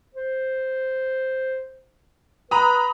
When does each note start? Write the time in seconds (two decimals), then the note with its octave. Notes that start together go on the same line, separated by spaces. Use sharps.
0.15 C5
2.51 B4 A#5 B5 D#6